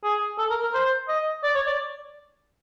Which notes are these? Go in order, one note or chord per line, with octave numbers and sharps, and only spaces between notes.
G#4
A4
A#4
A#4
C5
D#5
D5
C#5
D5